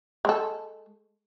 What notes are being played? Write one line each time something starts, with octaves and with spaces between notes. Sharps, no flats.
G#3 A4